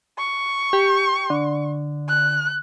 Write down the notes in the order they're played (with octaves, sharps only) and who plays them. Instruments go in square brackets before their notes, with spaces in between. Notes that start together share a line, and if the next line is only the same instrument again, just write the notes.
[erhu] C#6
[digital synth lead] G4
D3
[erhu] F#6